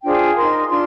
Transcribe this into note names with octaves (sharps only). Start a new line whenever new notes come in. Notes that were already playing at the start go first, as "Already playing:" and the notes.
D4 F4 G#4 C5 G5
D#4 A#4 C6
D4 F4 C6